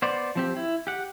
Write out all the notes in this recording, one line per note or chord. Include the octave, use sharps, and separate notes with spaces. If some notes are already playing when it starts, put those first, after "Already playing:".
B3 C5 D5
F3 C4 G4
E4
G4 F#5